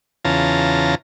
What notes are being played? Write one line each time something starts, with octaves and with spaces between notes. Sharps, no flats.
E2 C#3 F4 A5 A#5